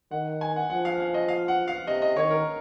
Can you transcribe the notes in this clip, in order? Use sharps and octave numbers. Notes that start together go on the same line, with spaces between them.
D#3 F#5
G#5
F#5
F3 F#5
F5
F5
D#5
F5
F#5
F5
C3 D#5
D#5
D#3 C#5
A#4